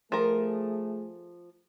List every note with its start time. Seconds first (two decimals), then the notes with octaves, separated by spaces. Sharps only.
0.12 F3 A3 G#4 A#4